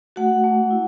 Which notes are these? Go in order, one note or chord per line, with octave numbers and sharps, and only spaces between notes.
A3 F#4 F#5
A3
E4